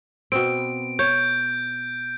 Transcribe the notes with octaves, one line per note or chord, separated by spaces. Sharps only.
B2 B3 C4 D7
C#5 G6